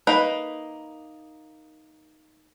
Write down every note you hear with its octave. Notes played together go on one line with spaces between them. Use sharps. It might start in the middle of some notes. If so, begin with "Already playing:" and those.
A#3 D#4 B4 B5